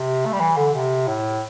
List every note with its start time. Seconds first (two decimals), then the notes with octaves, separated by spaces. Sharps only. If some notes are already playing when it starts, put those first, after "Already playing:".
Already playing: C3
0.26 A3
0.33 G3
0.40 E3
0.57 D3
0.74 C3
1.07 A2